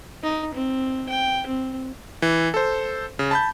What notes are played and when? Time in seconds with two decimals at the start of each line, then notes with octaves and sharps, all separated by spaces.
0.23 D#4
0.54 C4
1.09 G5
1.46 C4
2.22 E3
2.54 A4 C5
3.19 C#3
3.31 A5 B5 G6